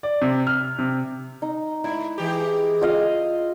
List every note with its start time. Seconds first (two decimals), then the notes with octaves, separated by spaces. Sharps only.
0.03 D5
0.22 C3
0.47 F6
0.79 C3
1.42 D#4
1.84 G#2 E4
2.18 E3 G#3 G4
2.81 F4 D#5 F5